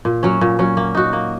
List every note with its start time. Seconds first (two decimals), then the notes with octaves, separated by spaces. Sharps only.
0.05 A#2
0.23 F#3 C#4
0.41 A#2
0.59 F#3 C#4
0.77 A#3
0.95 D#4 F#4
1.13 A#3